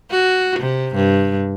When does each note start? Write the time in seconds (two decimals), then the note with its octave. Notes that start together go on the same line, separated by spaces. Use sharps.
0.10 F#4
0.59 C3
0.95 G2